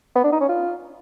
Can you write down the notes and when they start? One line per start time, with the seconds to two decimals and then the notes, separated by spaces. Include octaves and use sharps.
0.16 B3
0.24 D4
0.32 D#4
0.41 C#4
0.49 F4